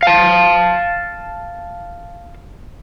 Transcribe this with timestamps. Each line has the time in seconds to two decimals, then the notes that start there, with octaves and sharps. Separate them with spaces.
0.03 F5 A5